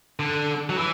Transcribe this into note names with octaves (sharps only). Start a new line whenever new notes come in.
D3
F#3
E3